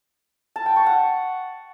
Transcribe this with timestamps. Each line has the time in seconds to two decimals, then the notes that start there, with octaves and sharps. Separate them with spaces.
0.56 A5
0.66 G5
0.76 C#6
0.86 F#5